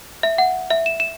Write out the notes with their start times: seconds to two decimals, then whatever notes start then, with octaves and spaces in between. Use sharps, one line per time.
0.23 E5
0.38 F#5
0.70 E5
0.86 E7
1.00 E7